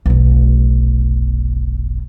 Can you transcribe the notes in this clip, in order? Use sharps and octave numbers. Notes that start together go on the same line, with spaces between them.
F1 B1